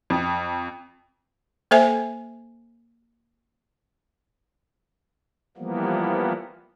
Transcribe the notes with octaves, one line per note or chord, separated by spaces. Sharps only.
F2
A#3 A4 C5 E5 G#5
E3 F3 G3 A#3 B3